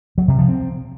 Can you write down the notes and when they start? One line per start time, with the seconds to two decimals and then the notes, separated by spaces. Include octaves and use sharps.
0.18 F#3
0.28 C3
0.38 F3
0.49 C4